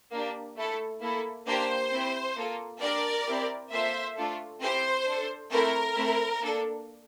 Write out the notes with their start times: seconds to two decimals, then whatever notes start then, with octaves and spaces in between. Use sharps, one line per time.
0.12 A#3 D4 G4
0.57 A3 E4 A4
1.01 A#3 E4 A4
1.46 A#3 D4 G4 C5
1.91 C4 E4 G4
2.36 A#3 F4 A4
2.81 D4 G4 A#4 D5
3.26 C4 E4 G4
3.71 A#3 F4 A4 C5 E5
4.16 A3 D4 F4 A4
4.61 C4 E4 G4 C5
5.06 D4 A4
5.51 A3 C4 E4 A4 A#4
5.96 A3 C4 E4
6.41 A#3 D4 A4